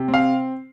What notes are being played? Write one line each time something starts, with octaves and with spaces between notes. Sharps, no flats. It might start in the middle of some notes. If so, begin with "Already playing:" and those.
Already playing: C3
C4
F5